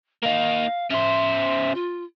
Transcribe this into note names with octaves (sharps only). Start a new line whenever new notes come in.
A#3 D#4 F5
C#3 C5 E5
F4